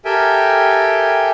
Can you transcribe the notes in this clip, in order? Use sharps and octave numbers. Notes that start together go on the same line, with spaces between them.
G4 A4 A#4 E5 G5 G#5